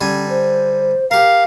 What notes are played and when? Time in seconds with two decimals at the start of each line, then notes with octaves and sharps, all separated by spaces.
0.01 D3 G3 C#4 G#5
0.29 C5
1.11 G4 A#4 F5